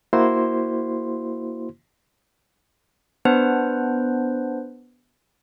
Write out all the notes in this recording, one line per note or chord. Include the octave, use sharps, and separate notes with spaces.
A#3 E4 F#4 C5 C6
B3 D4 B4 C5